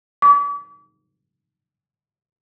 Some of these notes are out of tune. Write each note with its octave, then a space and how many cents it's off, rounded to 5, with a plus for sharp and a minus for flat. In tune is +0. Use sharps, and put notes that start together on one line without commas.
D6 -40